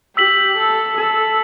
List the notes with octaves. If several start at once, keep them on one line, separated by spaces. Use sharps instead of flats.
G4 E6 B6 F#7
A4
A4